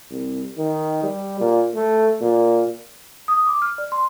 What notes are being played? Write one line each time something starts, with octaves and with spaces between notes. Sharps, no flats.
C2
D#3
G3
A#2
A3
A#2
D#6
D6
F6
D5
C6